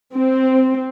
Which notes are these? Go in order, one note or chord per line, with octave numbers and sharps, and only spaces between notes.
C4